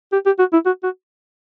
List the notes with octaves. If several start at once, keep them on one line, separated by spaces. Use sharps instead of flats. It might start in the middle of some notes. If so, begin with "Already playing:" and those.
G4
G4
F#4
E4
F#4
F#4